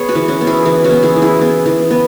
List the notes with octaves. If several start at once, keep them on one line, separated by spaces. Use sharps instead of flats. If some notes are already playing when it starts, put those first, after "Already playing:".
Already playing: B3 G#4 C#5
F#4 B4
E3
C#4 F#4
B3
E4 G#4
E3 E4
C#4 F#4
B3
E4 G#4
E3
E4 G#4
B3
E3
B3